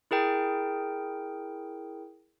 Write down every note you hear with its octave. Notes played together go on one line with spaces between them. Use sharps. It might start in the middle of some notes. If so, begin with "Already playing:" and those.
E4 G#4 A#4 G5